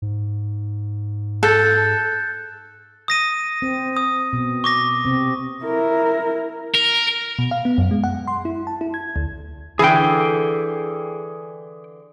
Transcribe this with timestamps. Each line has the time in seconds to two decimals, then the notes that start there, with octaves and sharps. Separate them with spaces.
0.02 G#2
1.43 A4 F#6 G6 A6
3.08 D#6 A#6 D#7
3.62 C4
3.97 D#6
4.33 B2
4.64 C#6 D6 A#6
5.04 C3 C4
5.64 E4 A#4
6.75 A#4
7.39 B2
7.51 F5
7.65 B3
7.78 F#2
7.91 G#3
8.04 F#5
8.27 C6
8.45 E4
8.67 A5
8.81 E4
8.94 G#6
9.16 D2
9.79 D3 E3 G#4 G5